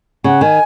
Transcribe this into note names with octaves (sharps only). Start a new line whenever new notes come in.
C#3 F#5
D#3 G#5